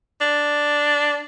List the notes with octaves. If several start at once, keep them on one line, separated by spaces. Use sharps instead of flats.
D4